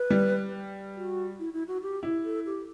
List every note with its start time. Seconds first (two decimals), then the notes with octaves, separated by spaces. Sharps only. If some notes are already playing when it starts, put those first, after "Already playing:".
Already playing: B4
0.10 G3
0.96 F#4
1.39 E4
1.53 E4
1.68 F#4
1.82 G4
2.03 E4
2.25 A4
2.46 G4